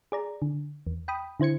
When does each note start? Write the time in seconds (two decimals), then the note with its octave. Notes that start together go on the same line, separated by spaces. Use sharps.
0.12 G#4 D5 A#5
0.42 D3
0.87 E2
1.08 G5 B5 D#6
1.40 D3 E4 C5 G#6 C#7